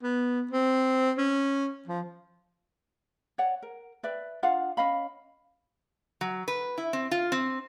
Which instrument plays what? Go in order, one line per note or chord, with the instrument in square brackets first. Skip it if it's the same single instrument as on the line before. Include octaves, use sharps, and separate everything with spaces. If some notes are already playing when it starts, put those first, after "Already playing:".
[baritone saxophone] B3
C4
C#4
F3
[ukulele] C#5 D5 F#5
A#4
B4 D5 E5
D4 F4 F5 F#5
C#4 D#5 F5 B5
[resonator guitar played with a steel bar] F#3
B4
E4
C4
F4
C4